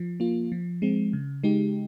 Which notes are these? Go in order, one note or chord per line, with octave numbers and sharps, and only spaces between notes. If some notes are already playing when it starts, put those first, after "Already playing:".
Already playing: F3
A#3 F4
F3
G#3 C4
C#3
G#3 D#4 G4